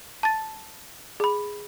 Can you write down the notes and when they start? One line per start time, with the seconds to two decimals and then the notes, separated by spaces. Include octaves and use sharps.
0.23 A5 A6
1.20 G#4 B5